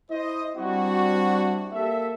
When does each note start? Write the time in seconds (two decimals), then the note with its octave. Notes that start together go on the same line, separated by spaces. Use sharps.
0.11 E4 C5 D#5
0.57 G3 C4 D4 E4 F#4
1.73 A#3 G4 A4 E5